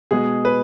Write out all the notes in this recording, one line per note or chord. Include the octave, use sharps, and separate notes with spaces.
B2 G#3 B3 G#4
B4